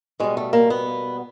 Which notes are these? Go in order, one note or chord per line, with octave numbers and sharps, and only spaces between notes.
B2 G3 G#3
A3
A#3
B3